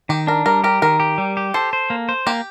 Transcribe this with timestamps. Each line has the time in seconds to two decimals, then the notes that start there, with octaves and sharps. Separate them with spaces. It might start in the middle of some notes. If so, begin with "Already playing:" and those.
0.09 D#3 G4
0.27 D4 A#4
0.46 G3 A#4
0.64 G4 A#4
0.82 D#3 A#4
1.00 G4
1.18 G3
1.37 G4
1.54 A4 C5
1.73 C5
1.90 A#3
2.09 C5
2.27 A#3 G4